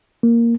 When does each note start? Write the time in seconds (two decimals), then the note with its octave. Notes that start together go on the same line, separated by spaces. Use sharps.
0.23 A#3